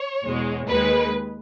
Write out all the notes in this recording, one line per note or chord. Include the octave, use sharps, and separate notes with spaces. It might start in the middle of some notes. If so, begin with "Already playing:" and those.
Already playing: C#5
E2 B2 G#3
D#2 D#3 G#3 B4